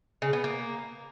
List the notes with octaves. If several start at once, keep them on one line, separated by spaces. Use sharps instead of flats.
C#3
B3
A#3